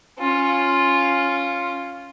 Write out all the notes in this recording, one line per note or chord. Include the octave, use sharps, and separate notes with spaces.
C#4 F4